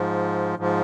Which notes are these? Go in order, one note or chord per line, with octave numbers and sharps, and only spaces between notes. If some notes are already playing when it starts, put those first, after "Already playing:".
Already playing: G#2 F3
G#2 F3